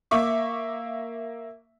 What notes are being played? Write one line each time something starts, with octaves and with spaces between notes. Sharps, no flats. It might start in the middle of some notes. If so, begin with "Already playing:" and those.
A#3 E5 C#6 D6